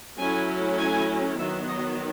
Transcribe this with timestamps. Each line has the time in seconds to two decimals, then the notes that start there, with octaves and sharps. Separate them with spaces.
0.18 F#3 A3 C#4 E4 G#5
0.78 G#5
1.38 D#3 F#3 B3 E5
1.68 D#5